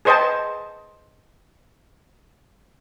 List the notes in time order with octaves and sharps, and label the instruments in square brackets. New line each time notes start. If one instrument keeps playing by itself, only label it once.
[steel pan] G#4 B4 C5 D#5 G5 A5